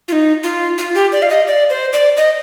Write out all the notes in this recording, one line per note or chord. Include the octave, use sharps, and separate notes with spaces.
F4
D#4
F4
F4
G4
D5
F5
D#5
D5
C5
D5
D#5